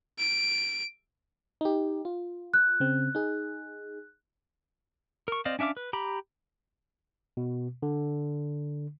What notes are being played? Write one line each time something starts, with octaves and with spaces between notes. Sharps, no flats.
D7
D#4 G4
F4
F#6
C#3 C4
D#4 G#4
A#4 C#6
C4 C5 D5 D#5 F5
C#4 D4 E5 F5 D6
B4
G4 A#5 B5
B2
D3